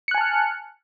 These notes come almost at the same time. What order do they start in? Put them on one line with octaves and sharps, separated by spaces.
C#7 F#6 G#5 A5 F6